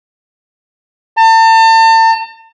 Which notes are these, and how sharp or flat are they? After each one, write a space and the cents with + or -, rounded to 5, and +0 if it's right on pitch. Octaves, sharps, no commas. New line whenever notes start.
A5 +40